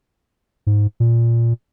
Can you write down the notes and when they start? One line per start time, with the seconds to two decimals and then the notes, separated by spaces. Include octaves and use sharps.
0.67 G#2
1.00 A#2